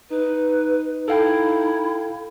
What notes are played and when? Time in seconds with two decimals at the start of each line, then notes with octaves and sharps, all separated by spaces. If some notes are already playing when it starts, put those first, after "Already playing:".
0.10 D#4 B4
1.08 E4 A4 F5 G5